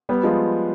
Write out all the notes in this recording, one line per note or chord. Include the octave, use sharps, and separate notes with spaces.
G3 B3
F3 G#3